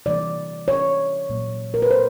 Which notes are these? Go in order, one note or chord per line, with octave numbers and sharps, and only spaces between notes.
C3 E3 G3 A#3 D5
C#5
A#2 F#3 A#3
A#4
B4
C5